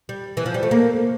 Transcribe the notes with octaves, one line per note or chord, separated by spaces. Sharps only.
G3
E3
F3
G3
A3
A#3